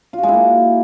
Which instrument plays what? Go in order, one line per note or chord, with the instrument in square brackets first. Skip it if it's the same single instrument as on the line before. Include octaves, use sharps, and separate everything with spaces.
[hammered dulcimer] F4
F#4
G#3
E4
A#3